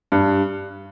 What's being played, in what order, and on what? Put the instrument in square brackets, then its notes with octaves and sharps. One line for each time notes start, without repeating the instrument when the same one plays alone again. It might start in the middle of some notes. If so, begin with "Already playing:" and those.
[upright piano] G2